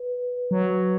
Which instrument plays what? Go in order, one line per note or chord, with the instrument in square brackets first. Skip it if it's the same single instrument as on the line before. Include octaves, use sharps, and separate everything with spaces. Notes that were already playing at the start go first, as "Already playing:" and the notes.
Already playing: [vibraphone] B4
[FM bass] F#3